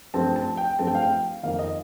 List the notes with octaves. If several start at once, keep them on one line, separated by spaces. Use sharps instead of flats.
G2 F3 A3 C4 A5
A5
G5
G2 F3 A3 C4 A5
G5
F5
G5
F2 D#3 A#3 D#4 F5
D#5